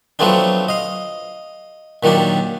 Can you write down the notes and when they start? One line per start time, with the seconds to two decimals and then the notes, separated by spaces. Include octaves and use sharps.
0.19 F3 F#3 A3 B3 C4 D4
0.68 D#5 F5
2.03 A#2 D#3 F#3 D4 G4